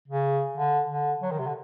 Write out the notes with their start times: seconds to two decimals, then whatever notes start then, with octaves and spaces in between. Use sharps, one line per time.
0.08 C#3
0.57 D3
0.89 D3
1.22 F#3
1.31 D#3
1.39 C3
1.47 D3